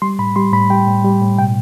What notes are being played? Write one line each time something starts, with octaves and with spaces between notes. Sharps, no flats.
G3 C6
A2 B5
G3 C6
A2 B5
G3 G5
A2
G3
A2
B2 G5